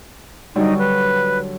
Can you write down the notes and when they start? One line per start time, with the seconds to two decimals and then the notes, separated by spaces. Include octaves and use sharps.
0.56 D3 F#3 G3 D#4
0.78 B4